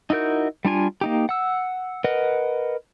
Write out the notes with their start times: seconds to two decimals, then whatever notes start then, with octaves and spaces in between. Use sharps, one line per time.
0.10 D#4 E4 F#4 A#4 G6
0.65 G3 D4 F4 G#5
1.01 A#3 D#4 G4
1.29 F#5 E6
2.04 A#4 B4 D#5 F#5